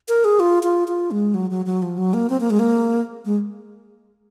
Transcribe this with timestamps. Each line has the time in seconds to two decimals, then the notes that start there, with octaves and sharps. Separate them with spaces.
0.08 A#4
0.24 G#4
0.39 F4
0.63 F4
0.88 F4
1.11 G#3
1.34 F#3
1.50 F#3
1.66 F#3
1.82 F3
1.98 F#3
2.13 A#3
2.29 C4
2.40 A#3
2.50 G#3
2.59 A#3
3.25 G#3